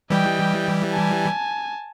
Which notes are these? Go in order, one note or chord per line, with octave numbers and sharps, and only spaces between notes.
E3 G3 D#5 G5
G#5 A5